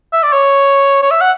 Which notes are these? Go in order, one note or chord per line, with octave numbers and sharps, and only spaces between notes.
E5
D5
C#5
C#5
E5
F#5